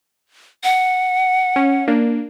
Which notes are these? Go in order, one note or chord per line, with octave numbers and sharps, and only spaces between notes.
F#5
C#4
A#3 D4